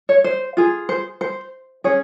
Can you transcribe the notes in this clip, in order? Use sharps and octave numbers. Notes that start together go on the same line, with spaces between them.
C#5
C5
F4 G#4
C5
C5
C#4 G#4 C#5